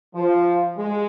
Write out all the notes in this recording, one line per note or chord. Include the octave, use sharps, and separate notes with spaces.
F3
G#3